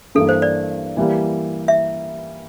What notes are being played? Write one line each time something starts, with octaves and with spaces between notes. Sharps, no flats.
G2 E3 A#3 A4
C5
D5
E3 G3 A#3
E5